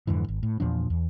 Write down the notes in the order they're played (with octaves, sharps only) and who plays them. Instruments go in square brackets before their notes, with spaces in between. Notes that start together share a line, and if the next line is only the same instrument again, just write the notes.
[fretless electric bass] F2 G#2 D3 E3
G#1
A2
E2 A#2 F3 D4
E2